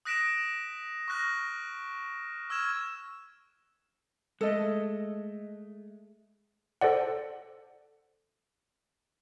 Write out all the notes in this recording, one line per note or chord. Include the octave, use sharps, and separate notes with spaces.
D#6 F#6 A#6 B6 D7 E7
C#6 F6 F#6 A#6
C#6 E6 F6 G#6 E7
G#3 A3 A4 D#5
A4 C5 D5 F#5